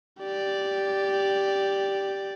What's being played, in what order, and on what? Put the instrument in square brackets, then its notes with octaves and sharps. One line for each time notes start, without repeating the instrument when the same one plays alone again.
[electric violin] G4 D5